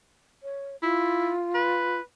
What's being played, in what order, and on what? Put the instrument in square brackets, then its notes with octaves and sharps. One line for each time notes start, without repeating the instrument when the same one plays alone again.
[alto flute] C#5
[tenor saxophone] E4 [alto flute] F4
[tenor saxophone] B4